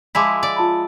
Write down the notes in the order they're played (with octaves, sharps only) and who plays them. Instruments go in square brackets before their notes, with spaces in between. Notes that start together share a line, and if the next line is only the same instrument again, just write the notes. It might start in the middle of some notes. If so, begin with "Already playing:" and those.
[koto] F3 G#3 E4 [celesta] D6 B6
[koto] D5
[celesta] F4 A5 B5